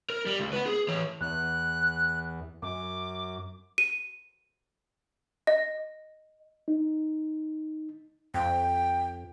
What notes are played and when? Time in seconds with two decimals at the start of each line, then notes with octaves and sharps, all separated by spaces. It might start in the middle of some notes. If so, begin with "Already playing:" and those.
0.10 A#4
0.26 G3
0.40 C#2
0.53 B4 F#5
0.66 G#4
0.88 E3 C#5
1.21 E2 F#6
2.62 F#2 D6
3.78 D#7
5.47 D#5
6.68 D#4
8.34 F2 G5